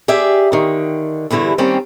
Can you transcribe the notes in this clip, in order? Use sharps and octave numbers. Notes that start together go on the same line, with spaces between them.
G4 G#4 D5 E5
D3 D#3
E2 G2 D3 E3 E4
D#3 G3 A#3 C4 C#4